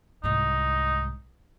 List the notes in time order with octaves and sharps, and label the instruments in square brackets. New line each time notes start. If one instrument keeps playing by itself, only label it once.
[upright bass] C2 G#2 [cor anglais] D#4